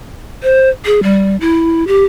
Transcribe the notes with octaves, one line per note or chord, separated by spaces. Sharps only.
C5
G#4
G3
E4
G4